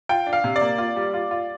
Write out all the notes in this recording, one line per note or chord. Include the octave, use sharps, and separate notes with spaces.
F4 G5
D4
F5
C3
D5
A#3
F4
G3
F4
F4